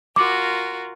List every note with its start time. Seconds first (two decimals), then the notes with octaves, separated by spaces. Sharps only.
0.16 F4 F#4 A#4 D6